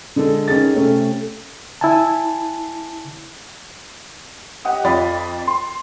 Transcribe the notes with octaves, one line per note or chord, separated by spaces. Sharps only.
D3 G#3 A4
D#3 C#4 G#4 A6
C3 A3 C4 C#4
E4 G#5 A5
G4 D#5 F#5 D#6
F2 F4 D5 D#5 B5 A6
C6